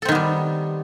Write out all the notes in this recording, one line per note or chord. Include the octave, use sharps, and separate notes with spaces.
D#3 G3 B3 C4 A4